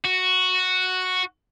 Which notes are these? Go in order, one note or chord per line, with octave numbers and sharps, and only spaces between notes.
F#4